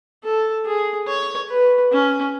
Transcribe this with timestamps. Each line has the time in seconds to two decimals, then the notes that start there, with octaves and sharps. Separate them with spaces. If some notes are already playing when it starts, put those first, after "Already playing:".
0.24 A4
0.66 G#4
1.08 C#5
1.50 B4
1.92 C#4